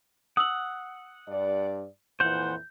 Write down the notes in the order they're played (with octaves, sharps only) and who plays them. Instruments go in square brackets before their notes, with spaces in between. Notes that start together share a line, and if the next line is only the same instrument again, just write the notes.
[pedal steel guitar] F#5 [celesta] D#6 E6 F#7
[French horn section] G2 D5
[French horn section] F2 A#2 E3 [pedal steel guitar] C5 F#5 [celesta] G6